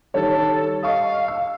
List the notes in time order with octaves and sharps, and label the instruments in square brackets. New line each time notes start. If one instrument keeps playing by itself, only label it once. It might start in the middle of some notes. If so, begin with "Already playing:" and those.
[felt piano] D#3 G3 C#5 [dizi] A4
[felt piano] D#5 C#6 D#6 [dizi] F5
[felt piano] E6